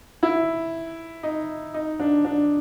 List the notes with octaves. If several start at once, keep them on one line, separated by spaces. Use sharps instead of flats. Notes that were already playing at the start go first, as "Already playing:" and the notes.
E4
D#4
D#4
D4
D4